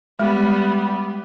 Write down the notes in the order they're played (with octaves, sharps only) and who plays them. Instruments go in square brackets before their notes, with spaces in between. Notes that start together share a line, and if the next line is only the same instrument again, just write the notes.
[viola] G3 B3 [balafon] G#3